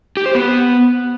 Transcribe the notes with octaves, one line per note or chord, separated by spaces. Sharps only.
G4
C5
B3